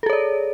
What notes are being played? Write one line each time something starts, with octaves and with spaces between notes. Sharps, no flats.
G#4 A4 C#5 D5